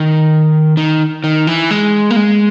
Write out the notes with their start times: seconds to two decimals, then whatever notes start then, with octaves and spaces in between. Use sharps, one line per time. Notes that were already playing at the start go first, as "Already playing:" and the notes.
Already playing: D#3
0.77 D#3
1.24 D#3
1.47 E3
1.71 G#3
2.11 A#3
2.16 G#3